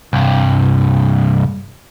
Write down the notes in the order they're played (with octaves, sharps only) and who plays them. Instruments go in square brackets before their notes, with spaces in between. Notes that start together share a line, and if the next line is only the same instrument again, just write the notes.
[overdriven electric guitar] C2 G2